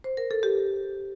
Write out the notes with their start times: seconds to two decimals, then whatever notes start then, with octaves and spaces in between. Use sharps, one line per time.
0.04 C5
0.17 A#4
0.31 A4
0.43 G4